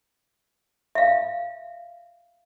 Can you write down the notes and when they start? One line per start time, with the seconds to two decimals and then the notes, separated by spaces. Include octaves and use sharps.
0.95 E5 F5